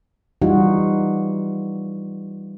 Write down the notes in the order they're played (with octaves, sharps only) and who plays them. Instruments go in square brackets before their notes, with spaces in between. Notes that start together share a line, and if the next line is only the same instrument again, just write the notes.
[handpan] E3 G3 D#4 F4 F#4